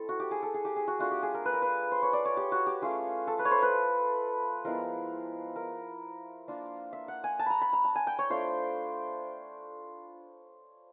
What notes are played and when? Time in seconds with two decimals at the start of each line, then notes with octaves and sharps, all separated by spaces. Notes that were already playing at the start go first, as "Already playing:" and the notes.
Already playing: A3 C4 E4 A4
0.09 F#4
0.20 G4
0.31 G#4
0.43 A4
0.54 G#4
0.65 G4
0.76 G#4
0.88 F#4
0.99 A3 D4 F4 F#4
1.11 G4
1.23 G#4
1.34 A#4
1.45 B4
1.53 A#4
1.62 B4
1.92 C5
2.03 C#5
2.13 D5
2.25 C#5
2.37 G4
2.52 F#4
2.66 G4
2.82 A3 C#4 F4 G#4
3.27 A4
3.39 B4
3.45 C#5
3.51 C5
3.62 B4
4.64 F3 G#3 B3 E4 A#4
5.56 A#4
6.48 A#3 D4 F4
6.93 E5
7.08 F#5
7.24 G#5
7.39 A5
7.46 A#5 B5
7.62 B5
7.73 A#5
7.85 A5
7.95 G#5
8.07 G5
8.19 C#5
8.30 A3 D4 F4 C5